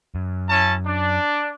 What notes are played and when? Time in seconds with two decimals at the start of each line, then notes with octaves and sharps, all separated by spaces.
0.15 F#2
0.48 C#4 E4 A5
0.86 D4